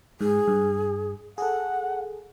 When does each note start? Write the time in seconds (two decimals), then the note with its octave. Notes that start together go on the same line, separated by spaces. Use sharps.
0.21 G#2 G#4
0.48 G2
1.38 G#4 A4 F#5